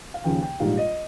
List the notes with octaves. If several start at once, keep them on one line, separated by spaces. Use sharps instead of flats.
F5
D#2 C#3 F3 G5
G5
A#1 G#2 G3 F5
D#5